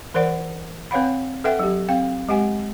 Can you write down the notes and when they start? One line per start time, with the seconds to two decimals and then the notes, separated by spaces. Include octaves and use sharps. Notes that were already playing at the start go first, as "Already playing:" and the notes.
0.14 E3 A#4 C5 D5 F#5
0.91 C4 B4 C#5 F5 F#5 B5
1.44 A4 B4 E5 F#5 G5
1.59 F#3 G4
1.88 C4 F5 G5
2.29 G#3 G4 F#5 G#5